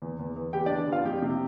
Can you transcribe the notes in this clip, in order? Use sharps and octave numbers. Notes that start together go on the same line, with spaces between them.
E2
E2
E2
E2 G4 G5
E2 D4 D5
E2 F4 F5
F2 G4 G5
C3